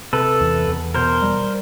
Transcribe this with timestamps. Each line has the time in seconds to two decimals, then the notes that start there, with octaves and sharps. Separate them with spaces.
0.13 C3 A4 B4
0.41 E2
0.68 E2
0.95 B2 A#4 C5
1.22 G3